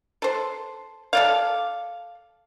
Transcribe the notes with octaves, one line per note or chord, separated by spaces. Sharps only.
A4 C5
A4 D5 F5